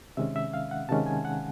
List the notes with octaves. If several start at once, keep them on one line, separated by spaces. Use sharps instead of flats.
C3 D#3 G#3 C#4 E5
E5
F5
F#5
C3 D#3 G#3 C#4 A5
G#5
F#5